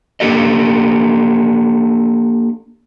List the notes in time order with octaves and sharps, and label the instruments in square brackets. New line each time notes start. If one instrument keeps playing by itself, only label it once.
[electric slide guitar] A#3 D4 G4 A4 D#5